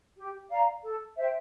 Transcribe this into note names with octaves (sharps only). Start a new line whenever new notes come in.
G4
D5 F5 A#5
A4
C5 E5 G5